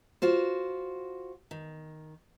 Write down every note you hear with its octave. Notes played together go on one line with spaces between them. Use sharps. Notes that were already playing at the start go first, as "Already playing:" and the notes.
F4 F#4 C5
D#3